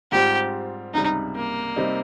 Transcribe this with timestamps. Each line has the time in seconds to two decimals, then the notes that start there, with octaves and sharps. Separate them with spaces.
0.12 G#2 G3 C4 F4 G4
0.94 C#2 C3 G3 D#4
1.36 A#3
1.76 C3 G3 C4 D#4